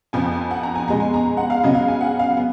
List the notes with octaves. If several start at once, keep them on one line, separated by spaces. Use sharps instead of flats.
F2 F3 B3 G#5
G#5
F#5
A#5
G#5
B2 G#3 B3 A#5
G#5
A#5
F#5
F5
C#3 F#3 B3 D#5
F5
G#5
F#5
F5
B3